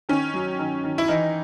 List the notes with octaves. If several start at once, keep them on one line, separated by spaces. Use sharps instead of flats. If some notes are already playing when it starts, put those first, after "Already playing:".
D#3 C#4
F#3
D#3
D#3
E4
E3 D#4